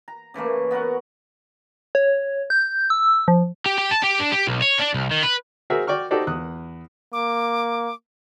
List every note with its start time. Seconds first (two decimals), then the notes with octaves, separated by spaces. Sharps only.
0.08 A#5
0.34 C#3 E3 A3 A#3
0.71 B3 F#4 A#4 F#5
1.95 C#5
2.50 G6
2.90 E6
3.28 F3
3.66 G4
3.78 G4
3.91 A5
4.03 G4
4.19 D4
4.32 G4
4.47 B1
4.62 C#5
4.79 D4
4.94 C2
5.11 D#3
5.23 B4
5.70 F#4 G#4 A#4 C5 E5
5.87 F#4 D5 G5 C#6 F6
6.11 D#4 F#4 G4 A4 C5 D5
6.27 E2 D#6 F#6
7.13 A#3 D6